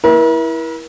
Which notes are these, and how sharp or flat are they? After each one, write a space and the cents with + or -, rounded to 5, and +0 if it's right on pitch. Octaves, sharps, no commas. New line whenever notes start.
E4 -5 A#4 +45